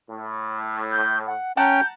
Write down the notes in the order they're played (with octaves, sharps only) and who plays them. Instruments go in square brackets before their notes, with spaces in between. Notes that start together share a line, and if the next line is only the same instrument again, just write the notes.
[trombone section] A2
[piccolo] G6
F#5
[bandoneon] C#4 G5 [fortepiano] F#5 A5 A#5 [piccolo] G6